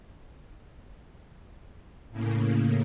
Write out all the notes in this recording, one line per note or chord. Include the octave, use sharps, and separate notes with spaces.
A2 C#3 A#3